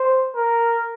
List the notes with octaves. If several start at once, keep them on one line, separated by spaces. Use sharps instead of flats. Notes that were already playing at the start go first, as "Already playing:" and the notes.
Already playing: C5
A#4